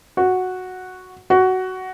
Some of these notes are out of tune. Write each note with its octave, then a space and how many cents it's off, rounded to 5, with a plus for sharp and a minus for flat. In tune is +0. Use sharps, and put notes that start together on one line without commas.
F#4 -5
F#4 +10